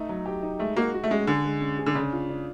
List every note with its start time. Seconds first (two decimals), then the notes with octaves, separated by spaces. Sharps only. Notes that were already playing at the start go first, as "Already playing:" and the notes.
Already playing: A3 D#4
0.09 F#3
0.26 G4
0.43 D#4
0.59 G#3 A3
0.76 A#3 F#4
0.94 F#4
1.04 A3
1.10 G#3 C#4
1.27 D3 G#4
1.45 G#3
1.61 C#4
1.79 G#4
1.86 D3
1.95 C#3 D4
2.13 F4
2.30 D4